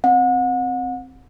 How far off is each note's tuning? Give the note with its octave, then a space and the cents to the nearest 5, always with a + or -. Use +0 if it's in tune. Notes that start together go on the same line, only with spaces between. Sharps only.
C4 +0 F#5 -35